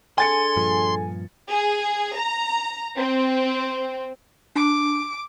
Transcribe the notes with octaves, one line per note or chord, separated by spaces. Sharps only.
D4 G#4 A4 G#5 C6 A6 C#7
G2 A#2 F3
G#4
A#5
C4
D4 D6